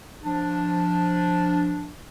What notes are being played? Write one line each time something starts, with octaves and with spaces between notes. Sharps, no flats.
F3 D4